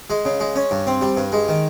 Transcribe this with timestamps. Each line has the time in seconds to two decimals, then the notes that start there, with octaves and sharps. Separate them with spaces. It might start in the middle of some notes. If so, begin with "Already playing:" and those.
0.10 G#3
0.25 C#3
0.40 G#3
0.56 C#4
0.71 G2
0.87 C4
1.01 G3
1.17 G2
1.32 G#3
1.48 D#3